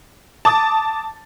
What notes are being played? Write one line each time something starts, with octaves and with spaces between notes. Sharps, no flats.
A5 D6 D#6 A6